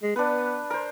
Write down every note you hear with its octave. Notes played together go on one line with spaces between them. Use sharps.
G#3
B3 D4 B4
A#4 C5